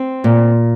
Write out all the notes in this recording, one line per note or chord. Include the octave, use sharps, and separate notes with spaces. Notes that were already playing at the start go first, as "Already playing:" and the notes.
Already playing: C4
A#2